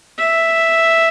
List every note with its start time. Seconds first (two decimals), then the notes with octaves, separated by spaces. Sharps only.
0.18 E5